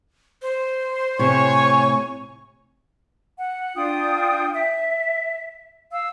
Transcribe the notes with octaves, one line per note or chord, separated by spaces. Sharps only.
C5
A2 C3 C#5 G#5 C#6
F#5
D4 F4 G5 D#6
E5
F5 E6